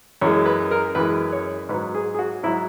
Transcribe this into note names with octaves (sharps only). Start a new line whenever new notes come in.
F#2 E3 G#3 C#5
B4
A#4
F#2 E3 G#3 B4
C#5
G#2 F#3 B4
G#4
G#4
F#4
G#2 F#3 E4